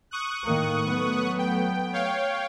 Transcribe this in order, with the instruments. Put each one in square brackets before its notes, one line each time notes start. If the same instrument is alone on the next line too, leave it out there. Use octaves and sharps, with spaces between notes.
[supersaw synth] C#6 D#6 F#6
[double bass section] A2 D#3 A#3
F#3 A3 B3
[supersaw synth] G5
C#5 F5 G5